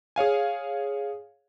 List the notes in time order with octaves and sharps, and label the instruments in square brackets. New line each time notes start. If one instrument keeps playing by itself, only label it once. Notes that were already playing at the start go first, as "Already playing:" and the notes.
[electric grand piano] G#4 C#5 F5 G#5